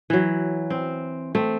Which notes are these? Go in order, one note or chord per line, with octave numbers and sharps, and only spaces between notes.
E3 F#3
C4
A3 C4